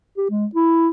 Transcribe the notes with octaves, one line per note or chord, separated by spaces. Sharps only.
G4
G#3
E4